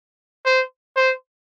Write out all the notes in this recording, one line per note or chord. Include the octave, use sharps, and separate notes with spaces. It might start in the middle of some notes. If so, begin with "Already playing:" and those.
C5
C5